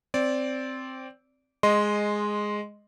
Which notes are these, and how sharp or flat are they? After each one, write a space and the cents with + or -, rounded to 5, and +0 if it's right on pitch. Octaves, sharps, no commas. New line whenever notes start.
C4 +0 D5 -15
G#3 +0 D#5 -5 C6 +0